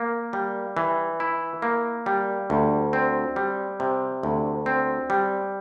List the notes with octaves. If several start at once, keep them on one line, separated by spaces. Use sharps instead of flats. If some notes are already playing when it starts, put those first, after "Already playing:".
Already playing: A#3
G3
E3
E4
A#3
G3
D2
C4
G3
C3
D2
C4
G3